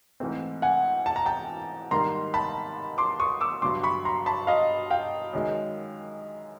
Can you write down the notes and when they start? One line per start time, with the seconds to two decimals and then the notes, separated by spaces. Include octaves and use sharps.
0.20 G#2 E3 A3 C4
0.62 F#5 G#5
1.06 A5
1.16 A#5
1.26 G5 A5
1.91 G#2 D#3 G3 A#3 A#5 C6
2.34 A5 B5
2.98 C6 D6
3.19 C#6 D#6
3.41 D6 E6
3.62 G2 D3 F#3 C6 D6
3.83 B5 C#6
4.05 A#5 C6
4.26 A5 B5
4.47 D#5 F5
4.90 F5 G5
5.33 F#2 D#3 G#3